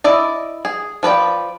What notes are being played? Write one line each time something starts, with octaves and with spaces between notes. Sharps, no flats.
E4 D5 D#5
G#4
F3 B4 D5 G5